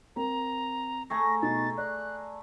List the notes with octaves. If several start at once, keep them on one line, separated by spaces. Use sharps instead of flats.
C4 A#4 A#5
A3 G#4 A#5 A#6
B2 D#4 A6
D5 F#6